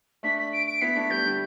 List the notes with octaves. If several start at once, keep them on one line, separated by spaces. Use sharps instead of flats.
A3 D4 B6
B6
D7
D7
B3 E4 B6
A3 D4
G3 B3 G6
D3 G3